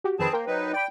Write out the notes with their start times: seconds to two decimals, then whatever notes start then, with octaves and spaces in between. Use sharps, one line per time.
0.04 F#4 G4
0.19 F2 D#3 C4 G#4 B4 A5
0.33 A#3 A#4 C5 G5
0.47 F#3 D#4 B4
0.73 D5 G5 B5